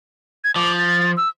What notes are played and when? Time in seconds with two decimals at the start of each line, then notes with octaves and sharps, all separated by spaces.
0.44 G#6
0.56 F3 D6
0.78 A6
1.17 E6